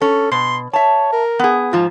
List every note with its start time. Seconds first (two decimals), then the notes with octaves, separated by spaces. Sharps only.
0.02 C#4 A4
0.31 B2 C6
0.73 C#5 E5 A5
1.13 A#4
1.39 B3 G#4
1.73 G#2 F3 F4